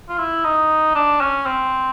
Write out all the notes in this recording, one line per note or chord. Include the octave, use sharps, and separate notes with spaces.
F4
E4
D#4
D4
C#4
C4